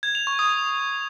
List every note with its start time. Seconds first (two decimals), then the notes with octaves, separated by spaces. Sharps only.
0.03 G#6
0.15 F7
0.27 C#6
0.39 D#6